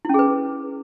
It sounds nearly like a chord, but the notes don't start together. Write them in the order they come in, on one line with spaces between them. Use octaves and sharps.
E4 C#4 G#4 B4